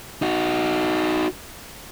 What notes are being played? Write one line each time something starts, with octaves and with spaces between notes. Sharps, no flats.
D#4 F#4